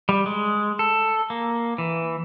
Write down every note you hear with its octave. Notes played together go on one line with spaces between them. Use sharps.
G3
G#3
A4
A#3
E3